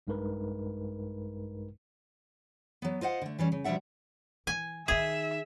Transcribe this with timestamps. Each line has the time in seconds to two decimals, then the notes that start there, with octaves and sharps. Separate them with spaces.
0.07 A#1 G2 G#3 D#4 A#4 B4
2.82 F#3 B3
3.01 F4 C5 D#5 F#5
3.22 D3 A3
3.39 E3 G3 C#4
3.52 C#3
3.64 B2 F3 G3 D4 E5 F#5
4.47 E3 G#5
4.88 D#3 D#4 G#4 E5